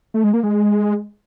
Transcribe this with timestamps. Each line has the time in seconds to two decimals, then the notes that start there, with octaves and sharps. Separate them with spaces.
0.14 A3
0.24 G#3
0.34 A#3
0.43 G#3